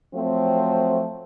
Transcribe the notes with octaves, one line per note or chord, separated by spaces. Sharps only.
F3 F#3 A3 C4